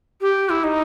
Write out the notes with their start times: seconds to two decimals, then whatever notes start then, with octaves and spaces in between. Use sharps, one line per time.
0.21 G4
0.50 E4
0.64 D#4